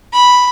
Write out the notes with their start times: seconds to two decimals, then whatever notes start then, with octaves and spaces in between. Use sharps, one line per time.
0.12 B5